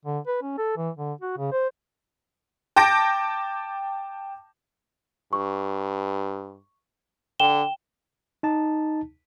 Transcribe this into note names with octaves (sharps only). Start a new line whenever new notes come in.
D3
B4
C#4
A4
E3
D3
F#4
C#3
C5
G5 A5 D6 G6 A#6 D7
G2 C#6
D3 G5 E7 G7
D#4 A5